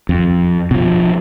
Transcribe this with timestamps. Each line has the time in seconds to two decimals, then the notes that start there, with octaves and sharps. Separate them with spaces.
0.09 F2
0.71 B2 F3